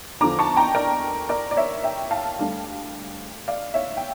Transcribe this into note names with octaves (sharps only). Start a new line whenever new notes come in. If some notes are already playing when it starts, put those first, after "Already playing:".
E2 D3 F3 A#5 D6
A5 C#6
G5 A#5
A#4 D5
A#4 D5
D5
C#5 E5
E5 G5
F5 A5
D2 D3 G3
D5 F5
C#5 E5
G5